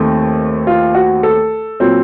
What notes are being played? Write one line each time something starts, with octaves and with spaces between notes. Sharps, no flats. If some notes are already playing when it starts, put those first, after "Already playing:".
Already playing: D#2 D#3 A3 C4
F4
F#4
A4
A#2 F#3 C4